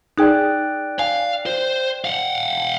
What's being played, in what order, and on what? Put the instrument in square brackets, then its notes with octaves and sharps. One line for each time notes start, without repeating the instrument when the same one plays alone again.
[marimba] D#4 G#4 G#5 [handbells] D5 G5 F#6
[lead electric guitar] F5 [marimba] G#5
[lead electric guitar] C5
F5 F#5